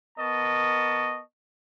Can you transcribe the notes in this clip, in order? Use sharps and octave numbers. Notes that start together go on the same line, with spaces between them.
B3 A#4 D#5 A5 C#6